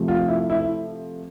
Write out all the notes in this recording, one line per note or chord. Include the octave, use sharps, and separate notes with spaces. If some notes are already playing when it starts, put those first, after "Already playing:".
Already playing: C3 F3 A3
F4
E4
E4